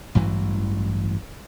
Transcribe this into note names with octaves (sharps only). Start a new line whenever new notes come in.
A1 G2 E3 F#3